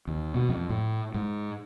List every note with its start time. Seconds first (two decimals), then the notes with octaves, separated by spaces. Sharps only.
0.07 D#2
0.34 B2
0.49 F2
0.70 A2
1.14 G#2